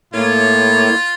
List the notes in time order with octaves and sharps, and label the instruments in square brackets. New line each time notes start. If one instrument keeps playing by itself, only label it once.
[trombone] A2 [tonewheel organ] A#3 E4 C#5 [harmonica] F4